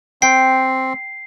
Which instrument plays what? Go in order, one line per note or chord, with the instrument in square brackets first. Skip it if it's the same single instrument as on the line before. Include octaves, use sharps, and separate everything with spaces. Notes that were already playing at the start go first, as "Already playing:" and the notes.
[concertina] C4 [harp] G5 [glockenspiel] C7